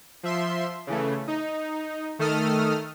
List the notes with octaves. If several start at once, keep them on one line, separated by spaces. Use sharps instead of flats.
F3 E5 C6
C#3 E3 A3
D#4
D#3 A3 A4 D#6 F6